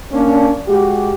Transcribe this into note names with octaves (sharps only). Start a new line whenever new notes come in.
A#3 C#4 D4
G#3 F#4 G4